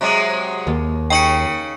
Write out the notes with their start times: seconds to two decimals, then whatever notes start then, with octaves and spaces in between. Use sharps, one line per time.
0.01 C3 F#3 G#3
0.67 D#2
1.10 C#3 D#4 G5 C#6 C#7